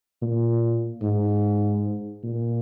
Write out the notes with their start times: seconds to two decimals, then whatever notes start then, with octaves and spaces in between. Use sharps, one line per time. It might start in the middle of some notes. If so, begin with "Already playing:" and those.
0.22 A#2
1.02 G#2
2.24 A#2